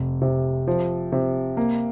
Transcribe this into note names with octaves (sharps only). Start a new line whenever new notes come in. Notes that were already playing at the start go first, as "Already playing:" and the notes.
Already playing: F1
C3
F3
C3
A#3